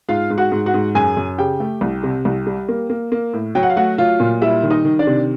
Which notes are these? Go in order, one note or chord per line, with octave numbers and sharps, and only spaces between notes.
G#2 F4 F5
G#2
F#4 F#5
G#2
F#4 F#5
G#2
F#2 G#4 G#5
F#2
C#3 G4 G5
A3
C2
C3
C2
G3
A#3
A#3
A#3
A2
F#3 G5
F#5
F5
A3 F#4 F#5
F#3 F4 F5
A#2
G3 E4 E5
D#3
D#4 D#5
D#3
D4 D5
C3